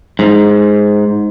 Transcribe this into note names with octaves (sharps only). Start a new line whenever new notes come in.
G#2